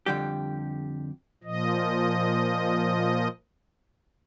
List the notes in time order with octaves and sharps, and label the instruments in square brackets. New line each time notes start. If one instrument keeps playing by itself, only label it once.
[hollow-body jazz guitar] F2 D3 G3 G4
[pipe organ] A#2 F3 D#5